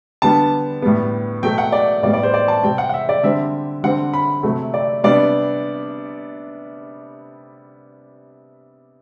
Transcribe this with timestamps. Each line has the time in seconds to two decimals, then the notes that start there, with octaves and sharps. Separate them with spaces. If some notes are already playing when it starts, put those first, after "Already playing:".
0.22 D3 G3 B3 D4 A5
0.82 A2 G3 B3
1.43 B2 F#3 A3 G5
1.58 F#5
1.72 D5
2.02 A2 G3 B3 D5
2.13 D5
2.23 C5
2.34 D5
2.48 A5
2.63 C3 G3 C4 G5
2.78 F#5
2.89 F#5
2.94 E5
3.09 D5
3.23 D3 G3 C4 E5
3.84 D3 G3 C4 F#5
4.14 B5
4.43 C3 F#3 A3
4.74 D5
5.04 C3 G3 B3 D4 D5